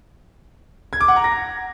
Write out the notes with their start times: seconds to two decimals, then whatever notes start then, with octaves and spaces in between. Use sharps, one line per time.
0.93 G#6
1.01 D6
1.08 F#5
1.16 A#5
1.24 A#6